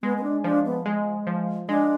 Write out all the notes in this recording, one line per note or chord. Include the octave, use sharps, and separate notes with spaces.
G#3 B3
B3
D4
F3 D4
B3
G#3
F3
G#3 D4